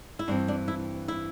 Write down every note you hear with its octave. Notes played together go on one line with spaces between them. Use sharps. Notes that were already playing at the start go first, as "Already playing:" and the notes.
E4
G2 E3 C4 D4
D4
E4
E4